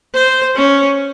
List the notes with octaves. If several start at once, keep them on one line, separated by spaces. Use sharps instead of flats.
C5
C#4